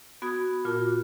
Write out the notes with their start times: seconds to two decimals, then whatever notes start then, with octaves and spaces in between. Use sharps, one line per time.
0.22 B3 F#4 B5 D#6 G#6
0.65 A#2 F4 F#4 A#4 A5